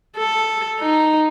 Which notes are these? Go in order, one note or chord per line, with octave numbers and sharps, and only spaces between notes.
A4
D#4